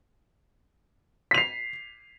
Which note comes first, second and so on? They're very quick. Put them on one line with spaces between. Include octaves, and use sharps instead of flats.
B6 F7 C7